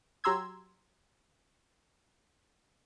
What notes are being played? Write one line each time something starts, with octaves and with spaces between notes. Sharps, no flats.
F#3 G4 A#5 C6 E6 G#6